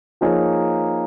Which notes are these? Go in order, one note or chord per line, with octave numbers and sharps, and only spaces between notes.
F3 A#3 D#4 G#4 C#5